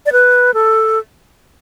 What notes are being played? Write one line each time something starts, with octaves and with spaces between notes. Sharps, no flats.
D5
B4
A4